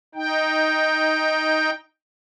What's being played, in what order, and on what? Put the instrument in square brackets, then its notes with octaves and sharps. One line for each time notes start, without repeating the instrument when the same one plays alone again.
[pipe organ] D#4 G5